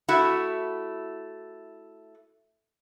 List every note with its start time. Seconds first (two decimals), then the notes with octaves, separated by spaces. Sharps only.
0.08 A3 E4 F#4